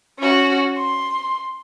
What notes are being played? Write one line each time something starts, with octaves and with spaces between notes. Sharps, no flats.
C#4 F#4
C6